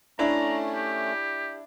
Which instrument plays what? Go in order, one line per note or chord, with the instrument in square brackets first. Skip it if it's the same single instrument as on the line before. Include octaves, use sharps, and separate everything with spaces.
[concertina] A3 C#4 [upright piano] D4 E4 [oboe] A#5
[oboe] G4